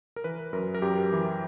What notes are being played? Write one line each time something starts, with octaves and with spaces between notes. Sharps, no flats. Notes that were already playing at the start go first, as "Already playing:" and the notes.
A#4
E3 B4
F#2 A#4
A#4
F#2 G4
E3